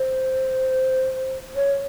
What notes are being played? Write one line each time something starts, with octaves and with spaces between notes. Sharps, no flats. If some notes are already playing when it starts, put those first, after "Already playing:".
Already playing: C5
C#5